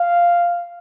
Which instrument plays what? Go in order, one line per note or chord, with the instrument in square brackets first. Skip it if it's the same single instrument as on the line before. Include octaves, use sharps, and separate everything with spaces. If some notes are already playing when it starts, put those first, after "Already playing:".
Already playing: [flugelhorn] F5